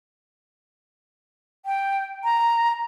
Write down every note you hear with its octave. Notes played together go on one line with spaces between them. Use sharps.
G5
A#5